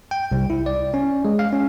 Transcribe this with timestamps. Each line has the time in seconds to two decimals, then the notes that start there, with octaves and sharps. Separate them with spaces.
0.11 G5
0.31 C2
0.50 E4
0.66 D5
0.94 C#4
1.25 G#3
1.39 F5
1.53 C#4